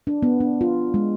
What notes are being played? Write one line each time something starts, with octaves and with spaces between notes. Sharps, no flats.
D4
B3
D4
F4
G#3